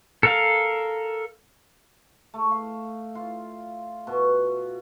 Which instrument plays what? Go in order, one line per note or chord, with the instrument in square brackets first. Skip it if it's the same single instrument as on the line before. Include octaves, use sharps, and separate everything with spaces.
[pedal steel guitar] A4 A#4 F5
[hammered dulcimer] A3
F5
F4
B2